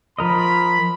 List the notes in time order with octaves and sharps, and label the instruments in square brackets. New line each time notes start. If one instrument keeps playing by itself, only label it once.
[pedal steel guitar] F3 A#4 D#5 [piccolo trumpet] B5